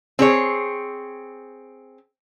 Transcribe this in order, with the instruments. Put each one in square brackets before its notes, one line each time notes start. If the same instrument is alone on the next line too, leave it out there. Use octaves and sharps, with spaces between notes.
[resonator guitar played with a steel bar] C4 G#4 C#5